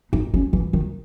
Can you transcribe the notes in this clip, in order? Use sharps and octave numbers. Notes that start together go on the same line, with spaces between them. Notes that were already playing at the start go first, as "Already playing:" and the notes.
D#4
C#4
E3
D#3